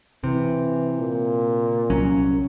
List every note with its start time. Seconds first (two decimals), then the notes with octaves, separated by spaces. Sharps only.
0.24 C3 E3
0.99 A#2
1.90 C2 F#3 C#4